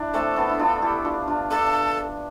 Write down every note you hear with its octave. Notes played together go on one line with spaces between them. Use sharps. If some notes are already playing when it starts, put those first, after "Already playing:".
Already playing: D4 E4
A3 C4 A4
B3 D4
E4
D4 F4
E4 G4
D4 F4
D4 F4
D4 F4 A4